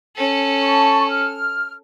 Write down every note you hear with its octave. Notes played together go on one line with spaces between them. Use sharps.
C#4 A4
A5 C#6
F6